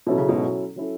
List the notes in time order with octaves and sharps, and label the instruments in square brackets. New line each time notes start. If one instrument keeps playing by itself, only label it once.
[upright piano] B2 [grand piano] F#3 C#4 E4 A4
[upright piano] C#3
G#2 B2
[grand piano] F#3 C#4 E4 A4